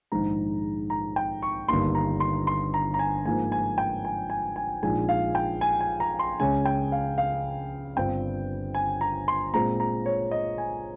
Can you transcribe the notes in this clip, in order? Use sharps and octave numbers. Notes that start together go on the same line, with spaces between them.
A#1 G#2 D#3 G#3 A#5
A#5
G5
C#6
G1 G2 D#3 A#3 C6
A#5
C6
C6
A#5
A#5
G#5
G#2 F3 A#3 D#4 G#5
G#5
G5
G#5
G#5
G#5
A#1 A#2 G#3 D#4 G#5
F5
G5
G#5
G#5
A#5
C6
C#2 C#3 G#3 C#4 G#5
G5
F5
F5
G1 G2 G3 C4 F4 G5
G#5
A#5
C6
A#2 G#3 C4 A#5
A#5
C#5
D#5
G#5